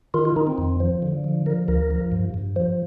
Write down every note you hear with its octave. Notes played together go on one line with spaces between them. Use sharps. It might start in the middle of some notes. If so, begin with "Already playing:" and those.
D#3 F4
F4
D#3 D#4
C4
F2
F3
D3
F3
F3 A#4
D2 A#4
F3
G2
G2
F3